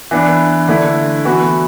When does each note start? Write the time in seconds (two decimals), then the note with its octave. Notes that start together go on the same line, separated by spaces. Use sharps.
0.11 E3 B3 D4
0.68 D3 A3 E4
1.25 E3 B3 F#4